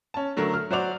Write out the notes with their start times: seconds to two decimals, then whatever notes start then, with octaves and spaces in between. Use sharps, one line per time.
0.14 C#4 A5
0.37 D3 F#3 A3 A#4
0.54 F6
0.70 F#3 F#4 C5 D5 F7